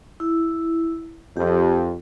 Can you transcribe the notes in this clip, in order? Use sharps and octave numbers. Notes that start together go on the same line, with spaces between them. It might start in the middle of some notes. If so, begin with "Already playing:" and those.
E4
F2 G4